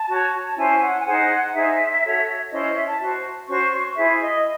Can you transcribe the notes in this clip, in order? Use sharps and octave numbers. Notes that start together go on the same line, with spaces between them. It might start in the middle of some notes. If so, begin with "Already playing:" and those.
Already playing: A5
F#4 C#5
A5
C#4 E4 C5 G#5
F#5
G#5
D#4 G#4 C5 F#5
D#4 G#4 C5 E5
F#4 A4 C#5
C#4 E4 C5 D#5
E5
A5
F#4 C5
C#4 F#4 C5 C#6
E4 G#4 C5 E5
D#5